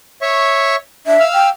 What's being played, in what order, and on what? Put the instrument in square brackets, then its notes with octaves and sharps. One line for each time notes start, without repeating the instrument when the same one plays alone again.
[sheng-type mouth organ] C#5 E5 C#6
[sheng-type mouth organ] D4 [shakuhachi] E5
[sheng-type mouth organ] F5 E6 F6
[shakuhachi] G5